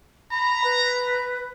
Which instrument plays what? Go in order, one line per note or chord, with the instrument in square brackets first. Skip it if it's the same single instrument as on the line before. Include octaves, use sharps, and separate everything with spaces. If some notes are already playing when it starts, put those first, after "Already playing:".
[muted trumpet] A#5 [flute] B5
[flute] B4